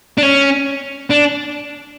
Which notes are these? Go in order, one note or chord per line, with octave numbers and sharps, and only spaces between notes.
D4
C#4
D4